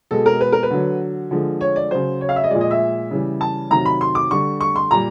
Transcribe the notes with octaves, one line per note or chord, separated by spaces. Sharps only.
B2 G#3 A4
A#4
B4
A#4
B4
D3 F#3
D3 F3 G#3
C#5
D5
C#3 F#3 C5
C#5
F5
E5
D#5
A#2 F3 G#3 D5
D#5
E5
C#3 E3 G3
A5
C3 D#3 F#3 A#5
B5
C6
D6
D3 G3 C#6
C#6
C6
A#2 G3 A#5